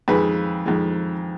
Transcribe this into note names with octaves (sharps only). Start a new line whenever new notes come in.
F2 D#3 G#3 G#4 B4
F2 D#3 G#3